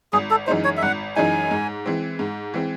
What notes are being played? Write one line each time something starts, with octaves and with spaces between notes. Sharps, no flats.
G#1 G#4
A4
F#2 E3 G#3 D#4 C5
C#5
E5
G#1 F#5
F#2 E3 G#3 D#4 G#5
G#2
E3 G#3 C4
G#2
E3 G#3 C4